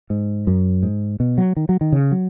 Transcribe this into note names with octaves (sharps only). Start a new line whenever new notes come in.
G#2
F#2
G#2
B2
F#3
D#3
F#3
D#3
C#3
F#3